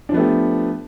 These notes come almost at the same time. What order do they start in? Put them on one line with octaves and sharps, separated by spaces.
D4 F3 B3 A3 G4